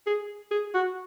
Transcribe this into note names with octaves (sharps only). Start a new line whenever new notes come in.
G#4
G#4
F#4